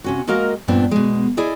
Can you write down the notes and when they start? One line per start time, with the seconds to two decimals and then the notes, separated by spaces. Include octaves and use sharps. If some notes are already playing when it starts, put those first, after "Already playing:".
0.04 C3 C#4 F#4
0.27 G#3 A#3 F#4 A#4 D#5 F5
0.68 G2 A#2 B3 C4 D4
0.91 B2 G#3
1.37 E4 G#4 D5 D#5